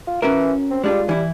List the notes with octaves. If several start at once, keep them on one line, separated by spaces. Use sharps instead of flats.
F4
E3 C#4 F#4 A#4
C4
G3 G#3 D4 F4
E3 G3 E4